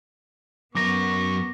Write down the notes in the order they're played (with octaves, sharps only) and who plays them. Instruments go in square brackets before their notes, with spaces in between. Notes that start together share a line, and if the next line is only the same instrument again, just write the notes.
[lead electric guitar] F#2 A#4 [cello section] B3 [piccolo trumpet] C#6 [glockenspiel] D6 A#6